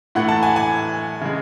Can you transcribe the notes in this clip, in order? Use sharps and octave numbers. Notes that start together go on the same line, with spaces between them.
A2 E3 A3 F#5
A5
G#5
G#5
C#3 G#3